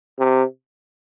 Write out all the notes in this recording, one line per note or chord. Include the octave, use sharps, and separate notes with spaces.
C3